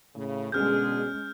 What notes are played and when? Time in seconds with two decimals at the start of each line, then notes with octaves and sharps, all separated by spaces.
0.15 A2 C#3
0.52 B2 D3 G#3 C#4 G#4 F6 G6